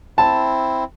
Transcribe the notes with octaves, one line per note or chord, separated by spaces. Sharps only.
C4 E4 A5